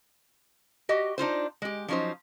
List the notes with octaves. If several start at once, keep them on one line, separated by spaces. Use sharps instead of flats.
F#4 G4 D#5
D4 D#4 F4 C5
G#3 G4
F3 F#3 C#4 D#4 C5